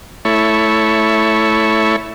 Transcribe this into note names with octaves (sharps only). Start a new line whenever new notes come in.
A3 E4 C#5